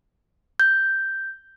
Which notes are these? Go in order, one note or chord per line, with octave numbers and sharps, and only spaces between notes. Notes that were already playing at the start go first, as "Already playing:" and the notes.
G6